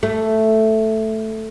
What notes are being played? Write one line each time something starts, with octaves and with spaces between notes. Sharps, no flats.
A3